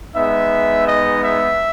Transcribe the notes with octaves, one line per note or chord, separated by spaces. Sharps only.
G#3 B3 D#4 E5
D#5
E5